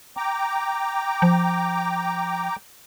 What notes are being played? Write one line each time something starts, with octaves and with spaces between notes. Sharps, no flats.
G5 A#5 D6
F3